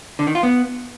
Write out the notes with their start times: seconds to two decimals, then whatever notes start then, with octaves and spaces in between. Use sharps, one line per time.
0.19 D3
0.27 D#3
0.35 F4
0.43 B3